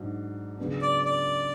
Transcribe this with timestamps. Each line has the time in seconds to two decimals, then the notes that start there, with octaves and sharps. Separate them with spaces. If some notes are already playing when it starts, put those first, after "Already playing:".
Already playing: G#2 F#3 D4
0.58 C#2 C#3 F#3 B3 D4
0.82 D5
1.05 D5